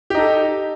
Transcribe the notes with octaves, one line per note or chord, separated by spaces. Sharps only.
D#4 G4 A4